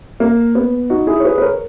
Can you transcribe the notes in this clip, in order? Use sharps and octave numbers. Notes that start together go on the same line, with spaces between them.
A#3
B3
D#4 F#4
E4 G#4
C#5
G#4 B4
B4
A#4 C#5